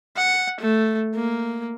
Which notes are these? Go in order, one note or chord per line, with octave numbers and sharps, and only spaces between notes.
F#5
A3
A#3